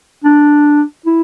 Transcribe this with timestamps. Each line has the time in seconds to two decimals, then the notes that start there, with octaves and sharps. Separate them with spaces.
0.24 D4
1.06 E4